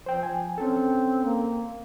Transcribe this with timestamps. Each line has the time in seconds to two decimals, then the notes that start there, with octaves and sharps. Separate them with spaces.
0.06 F3 C5 G5
0.23 G#5
0.58 C4 C#4 A4
1.24 A#3